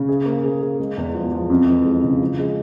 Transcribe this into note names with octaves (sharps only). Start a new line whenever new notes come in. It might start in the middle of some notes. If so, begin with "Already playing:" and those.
Already playing: C#3
G#4
A#3
G#4
G#4
G#3
E2
F3
F3
F2
E3
G#3
C#3
F3
G#3